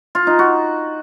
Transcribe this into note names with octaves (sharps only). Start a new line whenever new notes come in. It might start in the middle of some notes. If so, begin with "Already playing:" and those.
F4
D#4
F#4